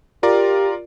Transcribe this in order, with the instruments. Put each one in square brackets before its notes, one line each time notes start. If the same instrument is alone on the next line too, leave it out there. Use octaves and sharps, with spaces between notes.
[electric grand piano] F4 A#4 D5 [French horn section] G4